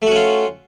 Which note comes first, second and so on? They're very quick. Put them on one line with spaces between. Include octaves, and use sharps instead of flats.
A3 F#4 C#4 F4